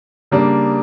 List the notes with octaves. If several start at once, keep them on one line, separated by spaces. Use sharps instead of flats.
C#3 G3 A#3 D4